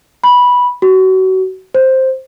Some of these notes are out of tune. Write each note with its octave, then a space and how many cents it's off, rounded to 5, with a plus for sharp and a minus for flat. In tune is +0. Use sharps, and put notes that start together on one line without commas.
B5 -10
F#4 +30
C5 +5